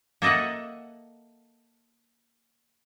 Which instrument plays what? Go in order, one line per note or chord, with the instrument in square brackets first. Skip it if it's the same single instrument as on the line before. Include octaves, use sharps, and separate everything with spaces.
[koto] A#3 A4 D#5 E5 F#5